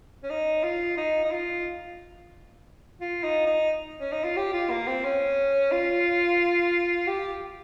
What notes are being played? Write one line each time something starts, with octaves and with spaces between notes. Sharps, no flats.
C#4
D#4
F4
D#4
D#4
F4
F4
D#4
D#4
C#4
D#4
F4
G4
F4
A#3
C4
C#4
F4
G4